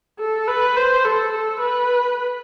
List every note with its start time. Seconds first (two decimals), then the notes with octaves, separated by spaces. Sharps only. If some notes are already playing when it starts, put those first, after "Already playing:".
0.20 A4
0.48 B4
0.77 C5
1.05 A4
1.33 A4
1.61 B4